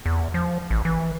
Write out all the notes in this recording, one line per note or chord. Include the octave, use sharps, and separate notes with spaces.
E2
F3
A1
E3